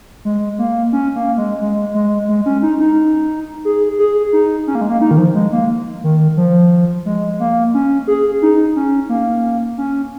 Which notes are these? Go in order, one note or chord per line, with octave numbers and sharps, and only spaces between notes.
G#3
A#3
C#4
A#3
G#3
G#3
G#3
G#3
C#4
D#4
D#4
G#4
G#4
D#4
C#4
A#3
G#3
A#3
D#4
D#3
F3
G#3
A#3
D#3
F3
G#3
A#3
C#4
G#4
D#4
C#4
A#3
C#4